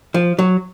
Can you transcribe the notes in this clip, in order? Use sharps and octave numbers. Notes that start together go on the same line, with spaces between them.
F3
F#3